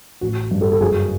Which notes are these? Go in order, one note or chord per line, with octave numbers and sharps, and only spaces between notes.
A1 F#4
G2
G4 A4
A4
F#1 F#4 G#4